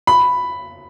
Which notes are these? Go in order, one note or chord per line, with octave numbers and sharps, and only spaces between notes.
B5